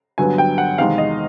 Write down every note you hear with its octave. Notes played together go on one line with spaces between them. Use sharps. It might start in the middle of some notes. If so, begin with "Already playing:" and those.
G2 D3 F#3 B3 G#5
G5
F#5
E2 C3 D#3 G#3 F5
D#5